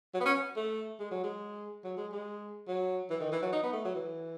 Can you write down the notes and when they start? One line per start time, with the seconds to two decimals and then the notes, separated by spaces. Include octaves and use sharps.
0.14 F#3
0.20 B3
0.25 C#4
0.56 A3
1.00 G#3
1.11 F#3
1.24 G#3
1.84 F#3
1.97 G#3
2.12 G#3
2.68 F#3
3.10 E3
3.20 D#3
3.32 E3
3.42 F#3
3.53 D#4
3.63 B3
3.73 A3
3.85 F#3
3.95 E3